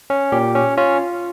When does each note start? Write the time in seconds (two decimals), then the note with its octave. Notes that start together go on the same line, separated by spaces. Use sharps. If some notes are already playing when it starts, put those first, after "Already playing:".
0.10 C#4
0.32 A#2 G4
0.55 C#4
0.77 C#4 F4